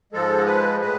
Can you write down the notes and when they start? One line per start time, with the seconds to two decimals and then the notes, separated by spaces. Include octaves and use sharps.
0.13 G#2 F3 G#3 A4
0.46 B4
0.81 A2 G#3 B4